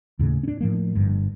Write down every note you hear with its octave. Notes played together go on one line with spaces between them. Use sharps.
D#2 A2 C#3
C#4 D4
A2 F3 A#3
G1 G2